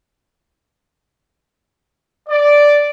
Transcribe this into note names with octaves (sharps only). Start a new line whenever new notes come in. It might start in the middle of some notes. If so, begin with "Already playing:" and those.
D5